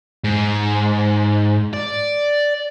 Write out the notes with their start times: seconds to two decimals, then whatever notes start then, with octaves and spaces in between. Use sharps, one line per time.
0.24 G#2
1.74 D5